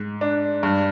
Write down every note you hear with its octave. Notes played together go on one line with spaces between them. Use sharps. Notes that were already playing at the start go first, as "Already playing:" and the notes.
Already playing: G#2
D4
G2